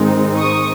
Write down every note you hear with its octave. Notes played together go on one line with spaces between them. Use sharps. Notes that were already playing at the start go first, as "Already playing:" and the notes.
Already playing: G#2 D#3 G#3 C4 D#4
C#6 D#6